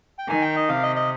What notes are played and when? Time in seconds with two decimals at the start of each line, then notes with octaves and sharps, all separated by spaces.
0.18 G5
0.28 D#3 G#5
0.42 G5
0.56 D#5
0.69 C3 F5
0.83 D#5
0.96 D#5